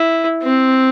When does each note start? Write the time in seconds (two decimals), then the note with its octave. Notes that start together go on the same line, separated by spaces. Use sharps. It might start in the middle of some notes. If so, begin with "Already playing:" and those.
Already playing: E4
0.43 C4